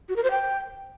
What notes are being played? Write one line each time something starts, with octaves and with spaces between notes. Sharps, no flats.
F#4
A#4
C5
G5